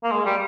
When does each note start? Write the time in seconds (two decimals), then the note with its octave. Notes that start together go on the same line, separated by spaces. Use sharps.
0.03 A#3
0.11 G#3
0.25 G3